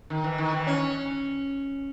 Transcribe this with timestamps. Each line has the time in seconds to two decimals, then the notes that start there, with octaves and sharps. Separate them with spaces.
0.10 D#3
0.24 E3
0.38 D#3
0.53 E3
0.67 C#4